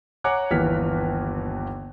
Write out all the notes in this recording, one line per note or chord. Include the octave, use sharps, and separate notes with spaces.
C#5 F#5 G#5 A#5 D6 F#6
G1 D#2 E3 A#3 F6 B6